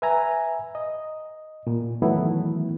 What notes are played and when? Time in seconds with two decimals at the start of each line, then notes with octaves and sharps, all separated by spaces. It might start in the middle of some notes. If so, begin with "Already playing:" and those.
0.02 B4 E5 G#5 A#5
0.75 D#5
1.67 A#2
2.02 D#3 E3 F#3 A3 B3 E4